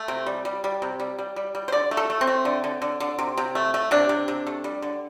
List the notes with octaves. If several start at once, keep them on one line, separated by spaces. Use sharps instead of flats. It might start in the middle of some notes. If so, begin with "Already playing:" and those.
Already playing: A3
C3
G3
G3
G3
C3
G3
G3
G3
G3
C5
D3 D5
A3
A4
A3
C4
A3
D3
D3
D3
D3
C3
C3
A3
A3
C3 D4
C3
C3
A3
G3
D3